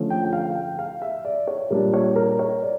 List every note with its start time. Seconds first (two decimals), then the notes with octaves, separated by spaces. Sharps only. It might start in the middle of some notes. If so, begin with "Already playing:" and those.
Already playing: D3 F3 A3 C#4
0.10 G5
0.24 G5
0.33 F5
0.50 F5
0.55 G5
0.79 F5
1.02 E5
1.25 D5
1.47 C#5
1.70 A#2 G3 D4 A#4
1.94 C#5
2.16 A#4
2.39 C#5
2.63 D5